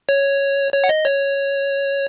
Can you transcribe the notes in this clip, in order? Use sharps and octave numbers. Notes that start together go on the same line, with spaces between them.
C#5
C#5
F#5
D#5
C#5